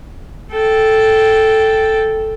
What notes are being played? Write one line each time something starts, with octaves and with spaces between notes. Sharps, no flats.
A4 G5